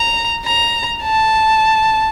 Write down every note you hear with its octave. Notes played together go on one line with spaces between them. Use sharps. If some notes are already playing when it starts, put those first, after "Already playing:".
Already playing: A#5
A#5
A5